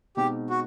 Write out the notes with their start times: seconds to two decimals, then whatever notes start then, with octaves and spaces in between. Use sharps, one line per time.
0.17 B2 G#3 C4 D#4 G4
0.50 F#4